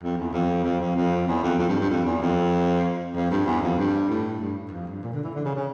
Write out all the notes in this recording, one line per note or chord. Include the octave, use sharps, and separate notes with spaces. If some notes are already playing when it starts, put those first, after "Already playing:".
F2
E2
F2
F2
F2
F2
E2
F2
F2
G2
G2
F2
E2
F2
F2
G2
E2
F2
G2
A2
G2
F2
G2
A#2
D3
E3
D3
C#3
C#3